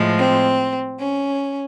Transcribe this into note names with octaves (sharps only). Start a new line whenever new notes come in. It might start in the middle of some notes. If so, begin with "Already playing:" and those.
Already playing: A2 F3 G#3
C4
C#4